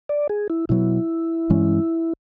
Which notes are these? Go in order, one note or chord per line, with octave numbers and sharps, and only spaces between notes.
D5
G#4
E4
B2 F#3 B3 E4
G2 E3 G#3 C#4